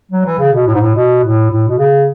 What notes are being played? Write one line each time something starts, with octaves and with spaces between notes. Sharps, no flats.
F#3
E3
C#3
B2
A2
G#2
A2
B2
A2
A2
B2
C#3